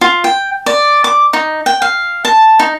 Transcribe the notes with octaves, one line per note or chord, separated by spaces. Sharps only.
F4
G5
D5
D6
D#4
G5
F5
A5
D#4